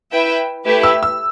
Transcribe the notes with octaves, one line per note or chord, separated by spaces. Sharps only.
E4 B4 E5 G5
A3 E4 G4 B4 E5
E6
E6